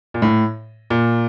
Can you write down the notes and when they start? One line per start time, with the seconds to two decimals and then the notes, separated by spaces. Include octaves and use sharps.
0.14 A#2
0.22 A2
0.90 A#2